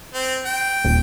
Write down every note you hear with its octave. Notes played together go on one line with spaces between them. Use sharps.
C4
G5
D#1